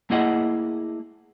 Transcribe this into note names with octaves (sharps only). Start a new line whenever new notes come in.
A3 A#3 E4 G#4 D#5 F#5